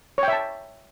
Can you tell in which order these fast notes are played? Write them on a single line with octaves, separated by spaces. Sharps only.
C#5 G5 E5 A5